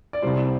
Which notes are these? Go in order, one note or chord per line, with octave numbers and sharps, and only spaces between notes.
D5
C2 C3 G3 C5